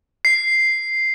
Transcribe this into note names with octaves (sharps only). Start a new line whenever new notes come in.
C7